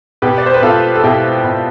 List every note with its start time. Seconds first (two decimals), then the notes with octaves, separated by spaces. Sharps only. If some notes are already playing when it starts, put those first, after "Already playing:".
0.22 B2 G4 B4
0.38 D5
0.46 C5
0.54 B4
0.62 B2 F4 A4
0.95 A4
1.04 B2 E4 G4
1.44 B2